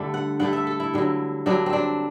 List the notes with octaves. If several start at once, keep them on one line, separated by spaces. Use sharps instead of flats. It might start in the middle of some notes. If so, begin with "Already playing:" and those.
Already playing: G2 D3 A3
F#5
G2 D3 A3 F#5
E5
A4
E4
G2 D3 F#3
G2 D3 F#3 D4
C4
D4